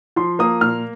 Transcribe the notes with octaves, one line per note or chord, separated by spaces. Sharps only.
F3 C6
A#3 D#6
A#2 F6